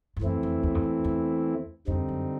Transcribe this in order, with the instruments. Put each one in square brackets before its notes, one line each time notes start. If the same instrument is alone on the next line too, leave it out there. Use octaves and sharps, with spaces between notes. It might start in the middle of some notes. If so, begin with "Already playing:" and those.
[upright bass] G2
[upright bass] F#2 [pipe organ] E3 A3 C4 E4
[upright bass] F2
E2
F2
E2
E2
[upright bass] F2 [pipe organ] D3 G3 C4 D#4
[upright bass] F#2